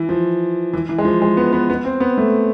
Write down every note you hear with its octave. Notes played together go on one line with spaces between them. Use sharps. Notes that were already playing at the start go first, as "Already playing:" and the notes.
Already playing: E3
F3
E3
E3
G#3
F3
G#3
B3
B3
B3
C4
B3
A3